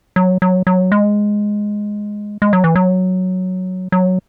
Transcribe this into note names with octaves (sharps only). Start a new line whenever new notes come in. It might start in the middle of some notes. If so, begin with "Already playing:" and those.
F#3
F#3
F#3
G#3
G#3
F#3
E3
F#3
F#3